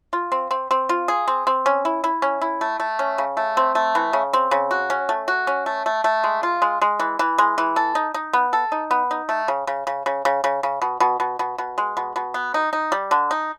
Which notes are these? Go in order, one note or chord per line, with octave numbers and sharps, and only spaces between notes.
F4
C4
C4
C4
F4
G#4
C4
C4
C#4
E4
E4
C#4
E4
A3
A3
C#4
C#3
A3
C4
A3
E3
C#3
C4
C#3
F#4
C#4
A3
F#4
C#4
A3
A3
A3
G#3
F4
G#3
G#3
E3
E3
G#3
E3
A4
D#4
D#4
B3
A4
D#4
B3
D#4
A3
C#3
C#3
C#3
C#3
C#3
C#3
C#3
B2
B2
B2
B2
B2
G#3
B2
B2
B3
D#4
D#4
G3
D3
D#4